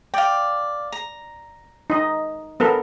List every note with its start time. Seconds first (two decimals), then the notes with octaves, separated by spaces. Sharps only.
0.14 D5 F5 G5
0.92 A#5
1.90 D#4 D#5
2.60 B3 A4 A#4